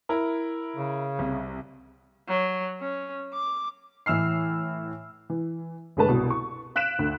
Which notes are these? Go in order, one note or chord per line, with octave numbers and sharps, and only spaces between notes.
E4 A#4
C#3
C2
F#3
C#4
D6
A2 E3 E6 F6 C7
E3
G1 G#3 A3 B4 A5
C2 B2
C#6
F5 F#6 B6 D7 E7
D2